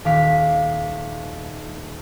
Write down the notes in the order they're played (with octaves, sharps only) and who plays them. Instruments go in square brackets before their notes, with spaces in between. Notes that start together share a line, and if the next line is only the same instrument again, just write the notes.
[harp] D#1 F5 D6 B6